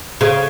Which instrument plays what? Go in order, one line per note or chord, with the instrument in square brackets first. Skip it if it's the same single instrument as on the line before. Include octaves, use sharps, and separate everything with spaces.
[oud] C#3